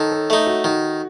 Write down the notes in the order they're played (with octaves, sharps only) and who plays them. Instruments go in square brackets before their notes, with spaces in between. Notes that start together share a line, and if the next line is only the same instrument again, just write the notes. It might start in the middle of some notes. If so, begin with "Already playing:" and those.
Already playing: [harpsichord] D#3 [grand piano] A4 C#5
[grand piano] A4
[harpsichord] A3 D#4 [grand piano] A4
[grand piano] F#4
[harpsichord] D#3 [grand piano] F#4